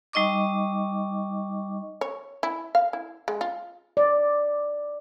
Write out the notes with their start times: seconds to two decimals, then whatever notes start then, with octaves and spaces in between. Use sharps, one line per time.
0.13 G3 D#4 D#5 C#6 D6
2.01 C#5
2.43 E4
2.75 F5
2.93 E4
3.28 G#3
3.41 F4
3.97 D5